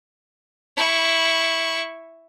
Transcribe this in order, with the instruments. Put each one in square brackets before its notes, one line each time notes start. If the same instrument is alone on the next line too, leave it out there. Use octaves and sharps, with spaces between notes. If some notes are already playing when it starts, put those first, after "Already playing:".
[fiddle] E4 C#6